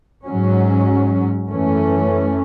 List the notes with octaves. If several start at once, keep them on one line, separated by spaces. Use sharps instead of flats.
G#2 F#3 C#4
F#2 E3 A3 C#4